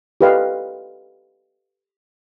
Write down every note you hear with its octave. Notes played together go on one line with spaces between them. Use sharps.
G4 A4 B4 D#5 F5